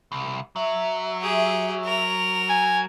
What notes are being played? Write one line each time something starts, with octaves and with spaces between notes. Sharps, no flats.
C2
F#3 E5
G4 G#4
A#4 F7
G#5